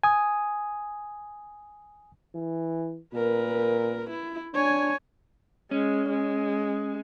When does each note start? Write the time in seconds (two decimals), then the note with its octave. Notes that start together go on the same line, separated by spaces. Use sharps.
0.04 G#5 D#6
2.35 E3
3.15 A#2 A#4 B4
4.10 E4
4.54 D4 C#5 G#5
5.71 G#3 C#4
6.10 G#3